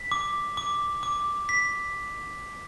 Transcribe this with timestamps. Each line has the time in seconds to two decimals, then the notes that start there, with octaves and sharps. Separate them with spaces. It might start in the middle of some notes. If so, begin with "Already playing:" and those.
Already playing: B6
0.12 D6
0.57 D6
1.03 D6
1.49 B6